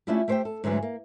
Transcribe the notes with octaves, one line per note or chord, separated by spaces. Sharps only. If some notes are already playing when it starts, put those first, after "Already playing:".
A3 C#4 D4 E4 F4 G4
A3 G4 C5 D#5 E5 G5
A4
G#2 D3 E3 F#3 A3
A#3